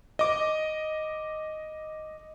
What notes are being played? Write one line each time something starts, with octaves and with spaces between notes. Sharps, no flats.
D#5 D6